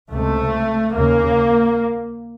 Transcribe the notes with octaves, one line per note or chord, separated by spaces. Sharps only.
C#2 C3 A3
D#2 C#3 A#3